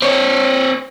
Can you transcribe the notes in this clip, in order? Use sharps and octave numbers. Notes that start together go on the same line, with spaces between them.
C4 C#5